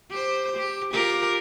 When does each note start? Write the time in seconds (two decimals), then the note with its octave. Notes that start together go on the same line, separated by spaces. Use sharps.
0.11 G4 C5
0.57 G4
0.93 F4 G4 A#4